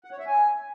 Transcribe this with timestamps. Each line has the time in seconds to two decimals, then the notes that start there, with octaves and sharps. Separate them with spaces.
0.04 F#5
0.12 C#5
0.19 E5
0.27 G#5